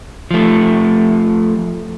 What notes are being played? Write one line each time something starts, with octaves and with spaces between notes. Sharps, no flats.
F3 A3